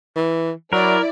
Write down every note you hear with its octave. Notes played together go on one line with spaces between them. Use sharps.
E3
F#3 E4 A#4 D5